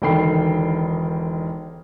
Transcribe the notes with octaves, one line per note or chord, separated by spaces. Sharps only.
E1 D3 D#3 G5 B5 C7